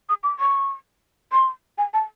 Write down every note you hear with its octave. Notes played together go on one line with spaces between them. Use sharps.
D#6
D6
C#6
C6
G#5
A5